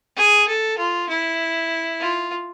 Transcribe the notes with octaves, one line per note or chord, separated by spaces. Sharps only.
G#4
A4
F4
E4
F4